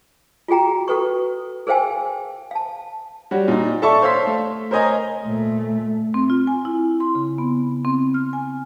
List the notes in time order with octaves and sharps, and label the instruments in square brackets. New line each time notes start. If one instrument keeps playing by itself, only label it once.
[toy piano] F4 F#4 G#4 G5 A#5
F#4 A4 B4 C#6
G#4 A#4 C5 F5 G5 G#5
F5 A5
[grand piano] G3 F#4 C#5
A#2 D#4
A4 D5 E5 A5 C#6
C5 C#5 F5 C6 E6 B6
A3
A#4 C5 C#5 D#5 G#5 A#5
[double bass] A#2 A3
[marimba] C4
F4
G#5
E4
C6
C#3
B3
C4
F6
G#5